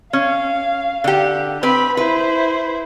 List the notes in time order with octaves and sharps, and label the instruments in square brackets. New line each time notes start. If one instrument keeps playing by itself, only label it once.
[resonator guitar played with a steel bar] C#4 [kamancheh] F5
[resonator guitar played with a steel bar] D3 G4
[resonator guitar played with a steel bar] C4 B4 [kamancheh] B5
[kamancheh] E4 C5 [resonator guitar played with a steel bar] B4